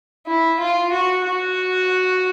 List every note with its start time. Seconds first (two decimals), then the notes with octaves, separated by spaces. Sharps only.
0.27 E4
0.60 F4
0.92 F#4
1.24 F#4